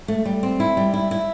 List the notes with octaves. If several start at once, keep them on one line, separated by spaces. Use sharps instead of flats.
A3
G3
C4
E4
G3
E4
E4